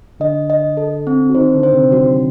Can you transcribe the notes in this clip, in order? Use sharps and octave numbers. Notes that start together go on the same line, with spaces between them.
D3 D4 D#5
D#5
A4
C4
F#4
D#3 D#4 C5
D3 D4
C5
C3 C4
F#3 F#4